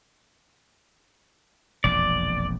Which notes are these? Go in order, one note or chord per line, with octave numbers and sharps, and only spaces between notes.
E1 A#1 F2 D5